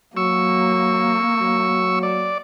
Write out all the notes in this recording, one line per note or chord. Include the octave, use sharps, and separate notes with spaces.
F#3 A#3 C#6 E6
F#3
D5